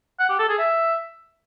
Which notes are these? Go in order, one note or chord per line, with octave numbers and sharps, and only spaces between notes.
F#5
G4
A4
G#4
E5